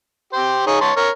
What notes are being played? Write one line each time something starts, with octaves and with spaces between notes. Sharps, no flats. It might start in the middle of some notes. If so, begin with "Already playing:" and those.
G4 C5
D#4 G#4 C#5
C#5 A5 C6
A#4 C#5